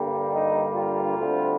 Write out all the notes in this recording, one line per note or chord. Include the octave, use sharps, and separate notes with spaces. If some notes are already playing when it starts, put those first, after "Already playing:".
Already playing: G2 D3 G3 A#3
D#4
F4
D2 D3 G3 C4